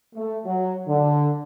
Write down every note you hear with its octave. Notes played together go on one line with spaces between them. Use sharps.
A3
F#3
D3